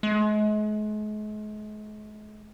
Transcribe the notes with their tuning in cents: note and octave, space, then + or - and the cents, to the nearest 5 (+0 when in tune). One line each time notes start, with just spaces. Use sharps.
G#3 +40